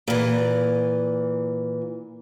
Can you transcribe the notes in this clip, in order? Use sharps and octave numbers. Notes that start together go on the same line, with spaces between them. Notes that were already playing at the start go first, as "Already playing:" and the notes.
A#2 E3